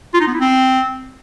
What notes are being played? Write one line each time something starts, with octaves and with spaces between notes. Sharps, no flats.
F4
D#4
B3
E4
C4